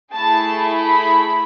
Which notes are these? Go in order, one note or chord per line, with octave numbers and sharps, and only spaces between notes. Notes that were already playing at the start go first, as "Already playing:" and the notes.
A3 E4 G#4 A5
B5